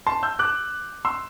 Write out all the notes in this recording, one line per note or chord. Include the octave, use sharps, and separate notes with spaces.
A5 C6
E6 G6
D6 F#6
C6 E6